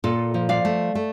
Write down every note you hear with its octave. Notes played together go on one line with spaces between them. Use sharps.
A#2 F4 A4
F3
D5 F5
A3
A3